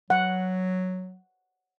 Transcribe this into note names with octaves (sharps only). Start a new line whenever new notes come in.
F#3 F#5